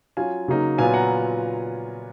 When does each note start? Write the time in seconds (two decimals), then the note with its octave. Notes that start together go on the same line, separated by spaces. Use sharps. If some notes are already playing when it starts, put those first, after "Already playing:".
0.17 F#3 C#4 F4 F5 G#5
0.48 C#3 F#3 A#3 D#4
0.78 A#2 F#3 B3 F4 F5 G#5
0.94 F#5 A#5